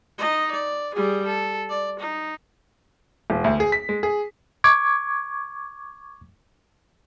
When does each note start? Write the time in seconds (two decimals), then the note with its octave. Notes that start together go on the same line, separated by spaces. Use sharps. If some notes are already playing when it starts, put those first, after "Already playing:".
0.18 D#4 D#5
0.51 D5
0.94 G3 G#4
1.26 A4
1.69 D5
1.99 D#4
3.30 E1
3.44 D2
3.60 G#4
3.72 B6
3.89 G#3
4.03 G#4
4.64 C#6 D6 G#6